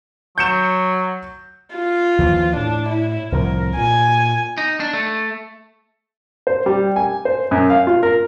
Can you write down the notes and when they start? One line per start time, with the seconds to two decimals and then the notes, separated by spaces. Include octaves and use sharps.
0.38 F#3 G6 C#7 E7
1.75 F4
2.19 D#2 E3 F3
2.57 A2 D4
2.89 E4
3.32 C2 A2 F3 A#4
3.77 A#2 G#5
4.58 D#4
4.80 D4
4.93 A3
6.47 C5
6.66 G3
6.96 G#5
7.25 C5
7.51 F#2
7.70 F5
7.87 F4
8.03 A#4